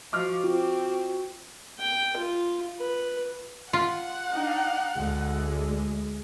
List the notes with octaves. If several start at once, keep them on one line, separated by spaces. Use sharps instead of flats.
F3 F#4 D#5 D6 F6
C4 F4
G5
F4
B4
F4 F#5
D4 D#4
D2 G#3